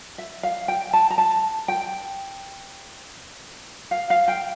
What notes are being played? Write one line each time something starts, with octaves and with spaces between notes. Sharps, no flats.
E5
F5
G5
A5
A#5
A5
G5
F5
F5
G5